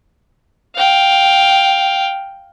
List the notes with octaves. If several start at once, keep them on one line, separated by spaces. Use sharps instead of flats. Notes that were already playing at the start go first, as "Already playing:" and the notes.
F5 G5